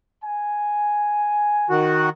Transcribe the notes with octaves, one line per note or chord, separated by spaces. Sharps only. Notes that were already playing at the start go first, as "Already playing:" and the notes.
G#5
D#3 F#4